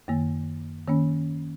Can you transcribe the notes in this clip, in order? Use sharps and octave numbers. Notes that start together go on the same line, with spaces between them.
F#2 D#3 A#3
D#3 A#3 C#4